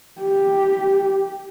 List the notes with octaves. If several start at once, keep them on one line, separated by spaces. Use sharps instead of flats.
G4